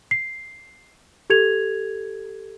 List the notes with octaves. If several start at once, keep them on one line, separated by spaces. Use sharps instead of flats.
C7
G4 A4 G#6 F7